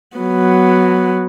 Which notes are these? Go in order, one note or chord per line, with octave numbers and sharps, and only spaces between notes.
F#3 B3